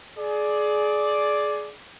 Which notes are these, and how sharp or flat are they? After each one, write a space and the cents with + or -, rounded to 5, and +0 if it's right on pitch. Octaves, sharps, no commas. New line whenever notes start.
G#4 +25 D5 +0